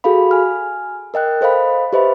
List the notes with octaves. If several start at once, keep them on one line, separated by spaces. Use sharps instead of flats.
F#4 G#4 A4 F5 B5
G#5 F6
A#4 D#5 G5 F#6
A4 C5 D#5 F5 B5
G4 B4 C5 D#5 E5 B5